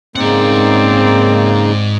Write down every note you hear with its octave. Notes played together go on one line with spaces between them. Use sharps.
G#2 C#3 A#3 C4 D#4 D5 F#5